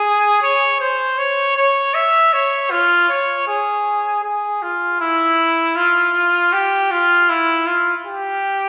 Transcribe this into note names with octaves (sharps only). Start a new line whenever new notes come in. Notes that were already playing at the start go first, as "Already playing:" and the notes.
Already playing: G#4
C#5
C5
C#5
C#5
E5
C#5
F4
C#5
G#4
G#4
F4
E4
F4
G4
F4
E4
F4
G4